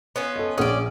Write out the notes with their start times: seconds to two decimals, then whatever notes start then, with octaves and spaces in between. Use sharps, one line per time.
0.16 B3 C#4 F4
0.36 A4 D#5
0.58 A#1 C#4 G#4 D5 D#6